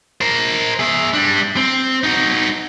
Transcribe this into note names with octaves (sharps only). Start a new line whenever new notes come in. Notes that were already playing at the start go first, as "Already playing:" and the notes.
A#4 C5
G#4 E5
G3 D4
C4
D#4 F#4